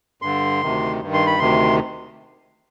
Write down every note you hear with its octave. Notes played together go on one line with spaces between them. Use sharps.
G2 D3 C6
D2 C3 D#3
G2 D#3
C6
B5
D2 C3 D#3 C6